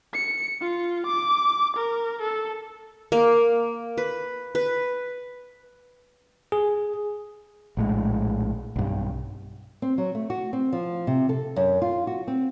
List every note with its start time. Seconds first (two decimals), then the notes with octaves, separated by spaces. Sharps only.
0.14 C#7
0.61 F4
1.06 D6
1.77 A#4
2.21 A4
3.12 A#3
3.98 B4
4.55 B4
6.52 G#4
7.77 A#1 A2 G#3
8.76 B1 G2
9.82 C4
9.98 F#3
10.15 A3
10.30 F#4
10.53 C4
10.73 F3
11.07 C3
11.29 A4
11.56 F#2
11.82 F4
12.07 F#4
12.27 C4